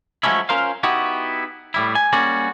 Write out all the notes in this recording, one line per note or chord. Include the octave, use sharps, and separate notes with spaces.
F3 F#3 G#3 A3 C#4 E4
C#4 F4 A#4 C5 F5
B3 D#4 E4 F#4 G4
A2 G3 E4
G#5
G3 A#3 C#4 F#4 G#4 D5